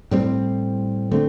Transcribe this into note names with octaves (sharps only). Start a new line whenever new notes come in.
A2 G3 C4
D3 A3 C4